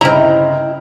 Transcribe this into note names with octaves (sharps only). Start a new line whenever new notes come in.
G1 C#3 C4 D#4 E4 G5 A#5 F6